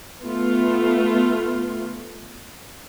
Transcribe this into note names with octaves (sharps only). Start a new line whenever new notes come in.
A3 B3 F4